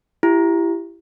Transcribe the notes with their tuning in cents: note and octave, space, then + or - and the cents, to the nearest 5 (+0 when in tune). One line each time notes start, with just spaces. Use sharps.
E4 +25 G4 +0